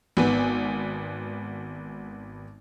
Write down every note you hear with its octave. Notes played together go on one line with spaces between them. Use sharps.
G#1 B3 G#5